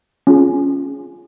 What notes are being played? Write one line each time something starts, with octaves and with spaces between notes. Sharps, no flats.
C#4 F4 G#4